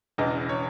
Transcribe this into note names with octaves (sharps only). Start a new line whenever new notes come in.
E1 E2 C#3 E3 D#5
C#5